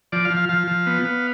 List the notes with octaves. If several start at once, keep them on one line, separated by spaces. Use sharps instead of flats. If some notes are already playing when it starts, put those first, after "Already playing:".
F3 D5
F5
F3
F5
F3 F5
F3
B3
B3